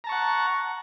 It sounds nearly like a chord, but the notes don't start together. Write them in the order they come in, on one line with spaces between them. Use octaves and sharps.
A#5 A5 C#6 F#5